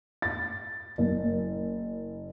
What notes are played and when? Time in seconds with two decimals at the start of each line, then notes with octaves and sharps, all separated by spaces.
0.22 A6
0.98 F#1